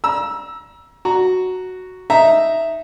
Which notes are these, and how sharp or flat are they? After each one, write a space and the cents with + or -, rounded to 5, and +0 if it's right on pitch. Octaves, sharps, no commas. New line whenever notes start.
A#5 +35 E6 +0
F#4 +0 A#5 +0
D#4 +0 E5 +0 A#5 +0